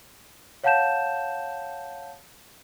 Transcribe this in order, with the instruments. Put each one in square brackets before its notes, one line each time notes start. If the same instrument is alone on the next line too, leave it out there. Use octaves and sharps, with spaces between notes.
[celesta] C#5 F5 F#5 A5 G6 E7